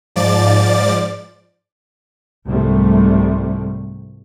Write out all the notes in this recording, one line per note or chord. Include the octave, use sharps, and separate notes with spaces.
G#2 F3 D5 D6 A6
C2 G#2 C3 F3 G3 A3